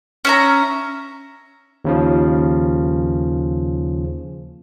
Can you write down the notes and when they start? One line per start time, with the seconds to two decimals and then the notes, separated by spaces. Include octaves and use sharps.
0.25 C#4 E5 A#5
1.85 D#2 C#3 F3